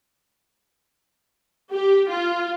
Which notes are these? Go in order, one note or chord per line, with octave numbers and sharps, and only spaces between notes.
G4
F4